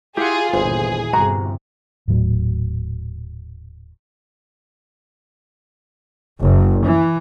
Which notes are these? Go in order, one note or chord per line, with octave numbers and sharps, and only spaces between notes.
E4 F4 G4 G#4 F#5
G1 D#2 A#2 E3 G#4 C5
G1 C3 F#4 A#5
D#1 A2 F#3
F#1
E3